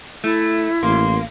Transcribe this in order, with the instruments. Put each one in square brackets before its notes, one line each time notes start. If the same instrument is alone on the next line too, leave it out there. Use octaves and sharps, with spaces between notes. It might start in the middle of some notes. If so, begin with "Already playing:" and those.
[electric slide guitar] A3 [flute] E4
[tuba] A1 [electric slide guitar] A#3 [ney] C6